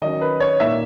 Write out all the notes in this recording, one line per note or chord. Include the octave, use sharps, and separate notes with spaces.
D#3 F#3 C#4 D#5
B4
C#5
A#2 A#3 D#4 E5